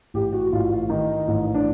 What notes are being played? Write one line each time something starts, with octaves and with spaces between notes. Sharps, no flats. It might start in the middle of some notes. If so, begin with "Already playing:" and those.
A1 G4
F#4
A1 F4
D#3 D#4
A1
D4